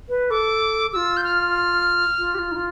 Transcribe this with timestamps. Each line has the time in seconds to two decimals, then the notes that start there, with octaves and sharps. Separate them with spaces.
0.09 B4
0.30 A4 D6
0.93 F4 G4 E6
1.17 G6
1.24 F6
2.18 F4
2.35 G4
2.39 F4
2.52 D#4
2.56 F4